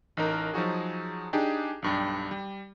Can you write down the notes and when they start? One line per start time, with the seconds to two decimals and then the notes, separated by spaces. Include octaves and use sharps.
0.17 A1 D#4 A#4
0.54 F3 F#3 D#4 F#4 G#4
1.33 D4 D#4 G4 G#4
1.82 B1 G2 G3
2.31 G3